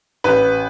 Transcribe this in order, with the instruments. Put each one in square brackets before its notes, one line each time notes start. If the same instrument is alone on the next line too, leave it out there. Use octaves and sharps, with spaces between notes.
[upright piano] A1 B4